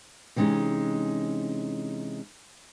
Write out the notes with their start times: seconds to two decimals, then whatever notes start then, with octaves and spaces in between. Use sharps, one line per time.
0.36 C3 E3 G#3 C#4 D#4